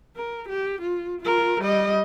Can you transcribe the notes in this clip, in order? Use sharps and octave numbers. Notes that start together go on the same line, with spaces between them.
A#4
G4
F4
F4 A#4
G3 D#5